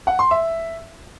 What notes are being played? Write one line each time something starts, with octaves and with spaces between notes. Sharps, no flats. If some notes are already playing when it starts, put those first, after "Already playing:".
F#5
C6
E5